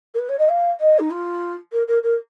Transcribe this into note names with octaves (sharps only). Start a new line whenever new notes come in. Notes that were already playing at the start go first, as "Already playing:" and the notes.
A#4
B4
C#5
D#5
F5
D#5
D#4
F4
A#4
A#4
A#4